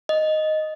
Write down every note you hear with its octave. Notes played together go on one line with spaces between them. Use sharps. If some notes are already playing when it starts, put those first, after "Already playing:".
D#5